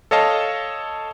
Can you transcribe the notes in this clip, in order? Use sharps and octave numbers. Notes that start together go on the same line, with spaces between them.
A4 C#5 D#5 F5 A5